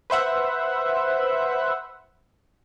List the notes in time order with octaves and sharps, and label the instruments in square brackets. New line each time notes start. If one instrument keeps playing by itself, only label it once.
[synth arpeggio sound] B4 C5 E5 F#5